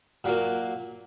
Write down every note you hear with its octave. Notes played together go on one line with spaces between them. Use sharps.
A#2 F#3 A#3